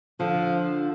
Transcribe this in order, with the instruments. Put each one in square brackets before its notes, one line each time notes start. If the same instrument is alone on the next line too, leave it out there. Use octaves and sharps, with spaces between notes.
[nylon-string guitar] D3 [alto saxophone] F3